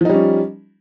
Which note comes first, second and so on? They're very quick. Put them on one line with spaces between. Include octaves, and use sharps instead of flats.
F3 D#4 G3 C#4